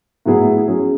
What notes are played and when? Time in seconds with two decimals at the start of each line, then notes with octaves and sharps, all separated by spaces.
0.26 A2 F#3 B3 E4 G#4
0.67 F#3 C#4 G#4